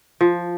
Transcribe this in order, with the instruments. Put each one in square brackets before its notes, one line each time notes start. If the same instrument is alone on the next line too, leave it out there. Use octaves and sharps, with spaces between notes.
[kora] F3